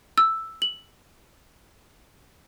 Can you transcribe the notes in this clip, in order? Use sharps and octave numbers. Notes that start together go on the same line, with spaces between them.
E6
F#7